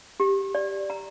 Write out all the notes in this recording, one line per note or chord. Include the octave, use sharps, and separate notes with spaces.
G4
D5
A#5